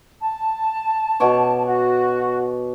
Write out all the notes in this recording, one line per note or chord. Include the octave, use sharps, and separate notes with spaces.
A5
B2 C#5 D6
F#4